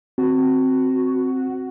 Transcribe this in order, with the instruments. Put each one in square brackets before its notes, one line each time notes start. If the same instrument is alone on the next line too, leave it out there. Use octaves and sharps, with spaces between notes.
[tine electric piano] C4 [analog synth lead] F#4